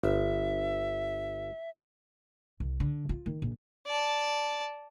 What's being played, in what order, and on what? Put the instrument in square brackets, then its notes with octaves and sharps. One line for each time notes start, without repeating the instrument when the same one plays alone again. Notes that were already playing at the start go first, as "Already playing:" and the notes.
[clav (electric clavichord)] G1 [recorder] E5
[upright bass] C2
D3
F4
D#3
A#1
[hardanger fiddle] D5 A5